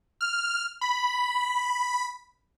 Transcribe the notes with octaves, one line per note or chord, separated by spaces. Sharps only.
F6
B5